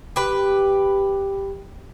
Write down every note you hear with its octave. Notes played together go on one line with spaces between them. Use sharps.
G4 B4